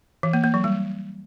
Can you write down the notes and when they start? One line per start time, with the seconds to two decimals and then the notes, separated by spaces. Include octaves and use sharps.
0.23 E3
0.33 A#3
0.44 A#3
0.54 F#3
0.64 G3